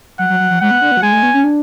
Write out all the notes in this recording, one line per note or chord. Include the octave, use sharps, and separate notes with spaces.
F#3 F#5
F#3
F#3
F3
G#3 F#5
B3
D4
B3
F#3
G#3 G#5
A3
B3
C#4
D4